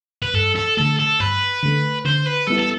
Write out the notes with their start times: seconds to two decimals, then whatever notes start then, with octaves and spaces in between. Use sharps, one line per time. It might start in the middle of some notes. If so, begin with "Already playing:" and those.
0.22 B4
0.34 G2 A4
0.56 A4
0.77 D3 A3 A4
0.99 A4
1.20 G2 B4
1.63 D3 A3
2.05 D3 C5
2.26 B4
2.47 G3 B3 E4 A4
2.59 A4